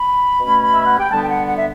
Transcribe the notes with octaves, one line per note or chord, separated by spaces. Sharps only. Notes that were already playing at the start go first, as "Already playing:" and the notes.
Already playing: B5
B2 A3 C#4
E5
F#5
G5
D3 G3 B3 A5
G5
F#5
F#5
E5